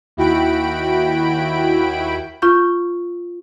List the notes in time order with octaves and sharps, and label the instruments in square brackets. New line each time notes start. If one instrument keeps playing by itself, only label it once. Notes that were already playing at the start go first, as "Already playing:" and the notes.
[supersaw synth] D#2 E4 F#4 G5 B5 D7
[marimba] F4 C#6 G6